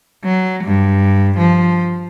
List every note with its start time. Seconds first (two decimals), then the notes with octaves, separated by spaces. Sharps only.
0.24 F#3
0.64 G2
1.38 F3